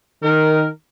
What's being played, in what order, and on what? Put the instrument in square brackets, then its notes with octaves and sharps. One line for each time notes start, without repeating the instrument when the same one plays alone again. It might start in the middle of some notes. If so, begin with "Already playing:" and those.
[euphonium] D#3 [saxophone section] A#4